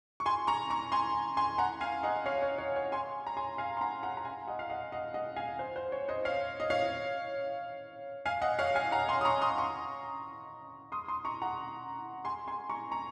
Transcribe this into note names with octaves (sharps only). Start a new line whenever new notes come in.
C#6
G#5 C6
A#5 C#6
A#5 C#6
G#5 C6
G#5 C6
F#5 A#5
F5 G#5
D#5 F#5
C#5 F5
C#5
C#5
C#5
G#5 C6
A#5
G#5 C6
F5 G#5
C6
F#5 A#5
F#5 A#5
A#5
F5 G#5
D#5 F#5
F5
D#5 F#5
D#5 F#5
D#5 F#5
F5 G#5
C5
C5
C#5
C5 D#5
C#5 F5
D#5
C#5 F5
F5 G#5
D#5 F#5
C#5 F5
F5 G#5
F#5 A#5
G#5 C6
D#6
A#5 C#6
C6 D#6
A#5 C#6
C6 D#6
C6 D#6
A#5 C#6
F#5 A#5
G#5 C6
G#5 C6
A#5 C#6
A#5 C#6